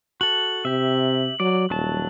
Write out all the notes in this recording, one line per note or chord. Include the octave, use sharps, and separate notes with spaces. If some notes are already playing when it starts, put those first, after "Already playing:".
F#4 A4 F#7
C3 G4 E5
F#3 D5
D#1 F#3 A5